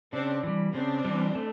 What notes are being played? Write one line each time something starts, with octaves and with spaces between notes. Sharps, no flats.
C#3 C4 D4
E3 G3
C#3 C4 D4
E3 G3
A3